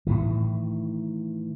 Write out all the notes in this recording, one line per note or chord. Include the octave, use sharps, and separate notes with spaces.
A2 D#3 E3